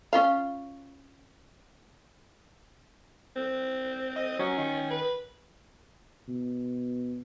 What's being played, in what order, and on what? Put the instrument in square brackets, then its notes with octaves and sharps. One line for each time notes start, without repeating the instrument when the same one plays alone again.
[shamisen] C#4 F4 F5
[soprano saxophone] C4
[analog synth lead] D#5
[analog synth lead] F#3 [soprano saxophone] C#4
[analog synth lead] D#3
[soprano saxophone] B4
[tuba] B2